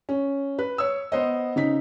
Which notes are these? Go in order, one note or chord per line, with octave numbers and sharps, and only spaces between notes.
C#4
B4
C#5 E6
B3 C5 D#5
C#3 D#4 B6